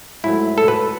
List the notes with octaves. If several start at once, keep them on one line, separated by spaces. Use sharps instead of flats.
G#2 F#3 A3 E4
A4
B4